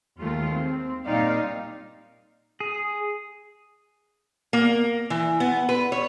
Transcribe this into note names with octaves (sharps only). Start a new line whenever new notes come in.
D#2 D#3 G#3 A3 F4
C4
A#2 G3 C4 D#4 D5 F5
G#4
A#3
E3
B3
B4
C#5